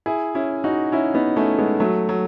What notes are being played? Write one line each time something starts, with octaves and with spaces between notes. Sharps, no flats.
E4 G#4
C#4 E4
D#4 F#4
C#4 E4
B3 D#4
A3 C#4
G#3 B3
F#3 A3
F#3